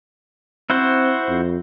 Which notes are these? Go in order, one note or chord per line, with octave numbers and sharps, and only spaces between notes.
C4 E4 F#4 C5
F2